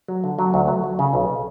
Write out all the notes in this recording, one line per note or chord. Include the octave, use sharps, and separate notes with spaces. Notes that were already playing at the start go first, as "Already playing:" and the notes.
F#3
D3
F#3
D2
F#3
F#3
C#3
B1